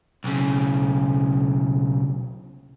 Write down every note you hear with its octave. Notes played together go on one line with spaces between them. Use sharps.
B1 C#3